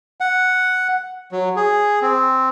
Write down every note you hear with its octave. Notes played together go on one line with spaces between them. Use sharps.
F#5
F#3
G#4
C4